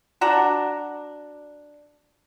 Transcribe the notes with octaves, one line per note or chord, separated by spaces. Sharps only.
D4 F#4 A#5